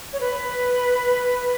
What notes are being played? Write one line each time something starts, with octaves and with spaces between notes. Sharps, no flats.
C#5
B4